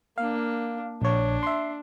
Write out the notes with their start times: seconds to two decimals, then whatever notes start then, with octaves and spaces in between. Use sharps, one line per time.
0.18 A#3 D4 F5
1.02 A#1 D4 C#5
1.43 E5 C6